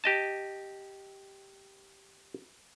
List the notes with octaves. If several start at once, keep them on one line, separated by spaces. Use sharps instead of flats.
G4 D#5 A5